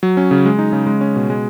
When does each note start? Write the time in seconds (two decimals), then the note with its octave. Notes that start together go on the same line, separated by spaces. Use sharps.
0.03 F#3
0.17 C#4
0.31 C#3
0.46 G#3
0.59 D#4
0.73 C#3
0.87 G#3
1.01 C#4
1.16 B2
1.30 G#3